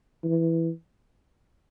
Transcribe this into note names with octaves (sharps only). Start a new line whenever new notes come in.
E3